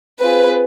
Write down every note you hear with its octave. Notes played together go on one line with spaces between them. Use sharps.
C4 F4 G#4 B4